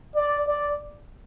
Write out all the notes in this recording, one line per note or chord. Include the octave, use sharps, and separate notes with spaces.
D5
D5